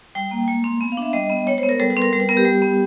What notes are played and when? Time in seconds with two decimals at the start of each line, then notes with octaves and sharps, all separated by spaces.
0.15 G3 G5
0.31 A#3
0.48 G#3 G#5
0.64 C4
0.81 B3
0.92 F5
0.97 D4 E5
1.13 G3 D#5
1.30 B3
1.47 G#3 C#5
1.58 C5
1.63 B3
1.69 A#4
1.79 G3 A4
1.90 B4
1.97 C4
2.02 A#4
2.13 G3
2.20 B4
2.29 B3 A#4
2.37 G4
2.45 G3
2.62 B3